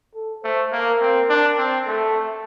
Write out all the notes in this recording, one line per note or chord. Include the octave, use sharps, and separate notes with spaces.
A4
A3 C5
A#3 A#4
C4
D4
C4
A3 A4